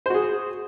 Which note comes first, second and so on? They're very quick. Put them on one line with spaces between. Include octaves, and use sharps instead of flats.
C5 F#4 G#4